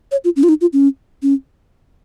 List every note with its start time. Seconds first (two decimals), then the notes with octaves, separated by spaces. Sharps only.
0.12 C#5
0.24 F4
0.36 C#4
0.43 F4
0.49 D#4
0.61 F4
0.73 C#4
1.22 C#4